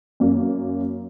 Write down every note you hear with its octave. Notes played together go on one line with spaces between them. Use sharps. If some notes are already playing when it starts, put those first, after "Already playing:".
F#2 A#3